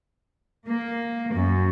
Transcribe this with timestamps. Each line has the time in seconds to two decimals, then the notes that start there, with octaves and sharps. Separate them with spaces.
0.67 A#3
1.36 F#2